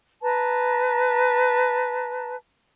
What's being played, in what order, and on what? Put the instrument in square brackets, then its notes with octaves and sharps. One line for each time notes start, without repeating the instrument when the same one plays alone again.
[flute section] B4 A5 A#5